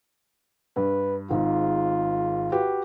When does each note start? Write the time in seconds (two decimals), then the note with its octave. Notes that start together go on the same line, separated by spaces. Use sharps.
0.77 G2 B4
1.31 G#1 G#2 F4
2.52 F#4 G4 B4